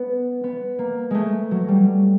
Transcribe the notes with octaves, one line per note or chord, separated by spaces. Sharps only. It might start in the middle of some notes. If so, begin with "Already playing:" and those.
Already playing: B3
B3
A#3
G#3 A3
F#3
G3